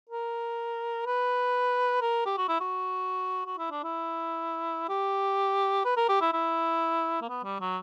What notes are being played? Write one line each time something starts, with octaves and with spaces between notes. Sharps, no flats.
A#4
B4
A#4
G4
F#4
E4
F#4
F#4
E4
D4
E4
G4
B4
A#4
G4
E4
E4
A#3
B3
G3
F#3